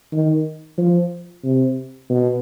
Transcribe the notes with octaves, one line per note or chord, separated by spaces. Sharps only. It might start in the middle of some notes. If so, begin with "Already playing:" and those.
D#3
F3
C3
B2